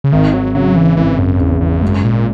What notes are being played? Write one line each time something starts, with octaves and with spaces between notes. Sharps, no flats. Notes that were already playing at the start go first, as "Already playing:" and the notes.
C#3
G#1 D#3
F#3
C#3 F#3
E3
G#1 E3
F#2
E2 C#3
E2
F#2 G#3
A#2